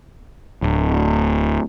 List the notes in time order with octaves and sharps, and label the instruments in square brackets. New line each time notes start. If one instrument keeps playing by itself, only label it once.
[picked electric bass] D1